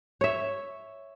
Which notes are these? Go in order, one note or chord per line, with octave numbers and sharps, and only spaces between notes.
C#5 E5